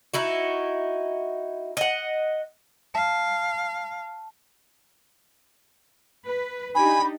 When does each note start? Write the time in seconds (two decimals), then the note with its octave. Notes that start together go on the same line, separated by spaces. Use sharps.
0.14 D#4 E4 F#4
1.77 D#5 F#5
2.95 F5 A5
6.25 B4
6.75 D4 D#4 G4 G#5 B5